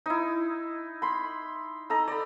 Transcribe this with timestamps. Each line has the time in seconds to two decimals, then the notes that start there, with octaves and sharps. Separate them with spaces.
0.06 D#4 E4
1.02 B5 C6
1.90 D#4 A4 A#5
2.08 D5 B5